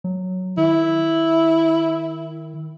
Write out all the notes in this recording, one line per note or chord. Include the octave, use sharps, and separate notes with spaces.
F#3
D#3 E4